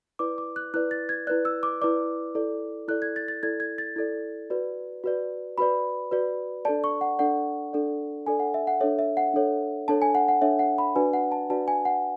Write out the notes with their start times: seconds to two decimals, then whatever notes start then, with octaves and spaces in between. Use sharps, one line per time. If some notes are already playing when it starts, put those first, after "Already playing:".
0.19 E4 B4 D5 D6
0.38 D6
0.56 F#6
0.74 E4 B4 D5 F#6
0.91 A6
1.09 G#6
1.27 E4 B4 D5 F#6
1.45 E6
1.63 D6
1.81 E4 B4 D5 D6
2.35 E4 A4 D5
2.88 E4 A4 D5 F#6
3.02 G#6
3.16 A6
3.28 A6
3.43 E4 A4 D5 G#6
3.60 G#6
3.78 A6
3.96 E4 A4 D5 G#6
4.50 F#4 B4 D5
5.04 F#4 B4 D5
5.58 F#4 B4 D5 B5
6.11 F#4 B4 D5
6.65 D4 A4 D5 A5
6.84 C#6
7.01 F#5
7.19 D4 A4 D5 F#5
7.73 D4 A4 D5
8.26 D4 A4 D5 G#5
8.40 F#5
8.54 E5
8.67 F#5
8.81 D4 A4 C#5 E5
8.99 E5
9.17 F#5
9.34 D4 A4 C#5
9.88 D4 A4 C#5 A5
10.02 G#5
10.15 F#5
10.28 F#5
10.42 D4 A4 C#5 E5
10.59 F#5
10.78 B5
10.96 D4 F#4 B4 D5 G#5
11.13 F#5
11.32 A5
11.50 D4 F#4 B4 D5 A5
11.68 G#5
11.85 F#5